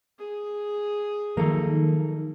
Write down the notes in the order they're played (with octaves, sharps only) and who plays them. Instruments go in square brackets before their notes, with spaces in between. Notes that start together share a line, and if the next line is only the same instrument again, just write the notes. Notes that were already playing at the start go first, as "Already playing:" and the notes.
[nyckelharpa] G#4
[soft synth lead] D#3 [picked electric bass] F3 F#3 [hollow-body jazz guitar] A#3 A4